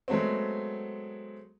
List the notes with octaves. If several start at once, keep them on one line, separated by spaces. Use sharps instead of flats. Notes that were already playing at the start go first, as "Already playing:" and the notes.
F#3 G#3 A3 B3 C4